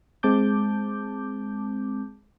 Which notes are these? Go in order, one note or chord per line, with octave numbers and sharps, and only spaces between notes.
G#3 C4 A5 D6 G6